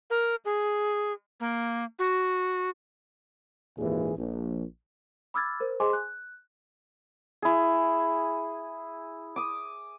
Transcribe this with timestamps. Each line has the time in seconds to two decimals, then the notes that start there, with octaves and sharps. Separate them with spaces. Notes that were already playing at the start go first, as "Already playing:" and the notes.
0.10 A#4
0.45 G#4
1.40 A#3
1.99 F#4
3.78 G#1 D#2 A#2 E3 G#4
4.17 A#1
5.34 B5 D6 E6 F6 G#6 A6
5.60 A#4 C5
5.80 G#4 C5 D#5 G#5 C6 D6
5.93 F#6
7.42 E4 G#4
9.36 D6 D#6